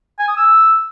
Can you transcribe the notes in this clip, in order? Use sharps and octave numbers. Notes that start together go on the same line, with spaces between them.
G#5
D#6
E6